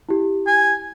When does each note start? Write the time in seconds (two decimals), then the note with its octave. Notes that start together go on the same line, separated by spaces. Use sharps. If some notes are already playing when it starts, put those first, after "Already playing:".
0.09 E4 G4
0.47 G#5